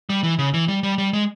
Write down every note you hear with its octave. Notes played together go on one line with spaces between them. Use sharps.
G3
E3
C#3
E3
G3
G3
G3
G#3